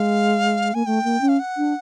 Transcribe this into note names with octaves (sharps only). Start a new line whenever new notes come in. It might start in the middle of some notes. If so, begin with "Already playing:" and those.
Already playing: G#3 F5
A#3 G#5
A3 G5
A#3
C#4
F5
F#5
D4